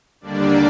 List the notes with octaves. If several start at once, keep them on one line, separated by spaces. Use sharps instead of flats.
D#2 D3 G3 A#3 D4 D5